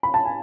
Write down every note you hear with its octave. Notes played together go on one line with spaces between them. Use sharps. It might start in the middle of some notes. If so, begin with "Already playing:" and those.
B5
A5
G#5